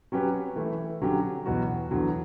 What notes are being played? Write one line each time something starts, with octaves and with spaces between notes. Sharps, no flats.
F#3 C#4 G4 B4
E3 A3 E4
D3 F#3 C#4 G4
E2 B2 F#3 B3 F#4
E2 D3 F#3